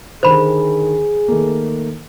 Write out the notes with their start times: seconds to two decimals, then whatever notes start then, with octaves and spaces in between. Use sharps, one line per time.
0.23 D3 D#3 G4 G#4 C5 B5
1.28 D#3 A3 A#3